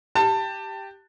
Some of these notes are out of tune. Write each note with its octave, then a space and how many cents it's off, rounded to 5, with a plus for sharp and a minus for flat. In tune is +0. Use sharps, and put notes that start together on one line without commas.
G4 +0 A5 +20